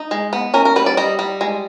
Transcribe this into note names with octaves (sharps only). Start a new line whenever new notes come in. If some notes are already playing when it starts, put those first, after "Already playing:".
Already playing: D#4
G#3
B3
C#4 A#4
A#4
G3 B4
D5
G3 D#5
G3
G#3